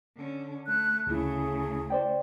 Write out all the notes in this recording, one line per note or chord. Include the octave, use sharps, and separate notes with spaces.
D3 C#4
A3 F#6
D2 C#3 A3 E4 G#4
C5 D5 G5